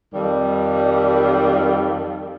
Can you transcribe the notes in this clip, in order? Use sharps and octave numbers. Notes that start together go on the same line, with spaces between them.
F2 D#3 G3